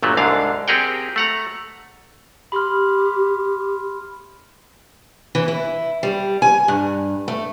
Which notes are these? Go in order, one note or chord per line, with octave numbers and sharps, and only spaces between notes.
G1 A#2 F#3 A3
C2 G#2 D3 D4 F5
C4 G4 G#4 A#4 F#5 G5
A3 F#5 A#5
G4 B5 C6 F6
E3
E4
G3
G#5
G2
A3